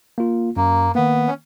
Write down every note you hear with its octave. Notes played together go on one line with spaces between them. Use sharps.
A#3 F4
F#2 A#3
D#3 A#3 B3
C#4